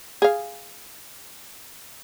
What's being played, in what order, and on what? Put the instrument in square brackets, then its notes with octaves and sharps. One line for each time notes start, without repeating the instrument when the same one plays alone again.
[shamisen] G#4 F5